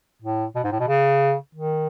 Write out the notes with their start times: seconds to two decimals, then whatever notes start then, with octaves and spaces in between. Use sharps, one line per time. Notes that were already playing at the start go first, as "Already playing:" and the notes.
0.22 A2
0.56 B2
0.64 G#2
0.72 A2
0.80 B2
0.88 C#3
1.55 D#3